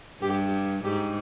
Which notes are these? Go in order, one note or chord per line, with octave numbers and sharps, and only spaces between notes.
G2 G4
G#2 G4